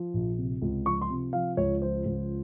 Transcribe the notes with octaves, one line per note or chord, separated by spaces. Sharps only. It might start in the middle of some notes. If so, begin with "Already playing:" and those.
Already playing: F3
A#1
C3
C#2
F3 C#6
C6
C3
F3 F5
C#2 C#5
F3 C5
C#2